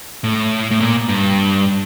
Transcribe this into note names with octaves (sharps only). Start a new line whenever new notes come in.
A2
A2
A#2
G2